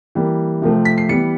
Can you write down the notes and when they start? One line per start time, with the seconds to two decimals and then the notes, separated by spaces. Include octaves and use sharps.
0.15 E3 G3 A#3
0.62 C3 F3 A3 C4
0.85 B6
0.98 C7
1.09 E3 G3 B3 C#7